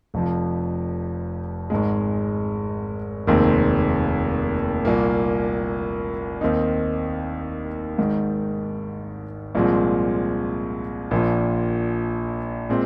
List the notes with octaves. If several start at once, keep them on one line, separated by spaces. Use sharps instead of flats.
F1 F2 F3
G#1 G#2 G#3
F1 D#2 D#3 G#3 C4
C2 A#2 A#3
D#2 D#3 C4 D#4
G#1 G#2 D#3
C2 A#2 F3 G#3 C4
A#1 A#2 F3
A#2 G#3 C4